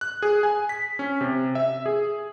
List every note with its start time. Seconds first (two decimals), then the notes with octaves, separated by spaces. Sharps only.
0.01 F#6
0.22 G#4
0.43 G#5
0.69 B6
0.99 C#4
1.21 C3
1.55 E5
1.86 G#4